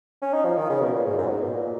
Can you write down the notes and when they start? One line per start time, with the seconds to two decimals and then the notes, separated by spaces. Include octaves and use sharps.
0.22 C#4
0.33 D#4
0.45 F3
0.57 D#3
0.69 C#3
0.81 B2
0.93 A#2
1.05 G#2
1.18 F#2
1.26 A#2
1.30 G#2
1.41 B2
1.53 A#2